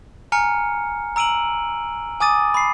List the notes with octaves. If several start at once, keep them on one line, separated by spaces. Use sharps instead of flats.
G#5 A#5 F6 C#7
A#5 E6 D7 D#7 F#7
G#5 D6 D#6 A6 D#7
B5 C7